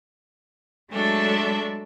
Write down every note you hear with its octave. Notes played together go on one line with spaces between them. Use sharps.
F#3 G#3 A3 D4 A4 E5